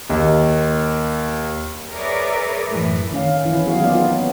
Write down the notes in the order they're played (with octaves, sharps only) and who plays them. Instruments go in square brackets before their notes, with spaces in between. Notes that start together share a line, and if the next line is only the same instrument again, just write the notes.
[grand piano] D#2 D#3
[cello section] G#4 A#4 B4 C#5 D5 E5
F#2 A2 E3
[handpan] D#3 C#4 F5
E3 C#4 E4
F#3 B3 E4 G#4 C#5 F5
A#3 B3 D#4 F4 G#4 D5
B3 C#4